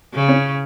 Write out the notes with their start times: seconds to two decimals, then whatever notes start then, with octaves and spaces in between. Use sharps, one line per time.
0.14 C#3
0.28 C#4